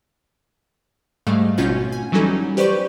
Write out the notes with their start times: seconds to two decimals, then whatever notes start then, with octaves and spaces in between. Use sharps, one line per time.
1.27 G#2 G3 A3 F5
1.58 G#1 B2 C#4 F4 F#4 G6
1.92 G#5
2.12 E3 F#3 G3 C#4 D#4 A4
2.57 G4 B4 C5 D5 C#6 G6